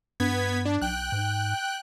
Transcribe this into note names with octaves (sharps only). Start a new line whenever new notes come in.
G2 B3 G#6 B6
D4
B1 G5 F#6
G#2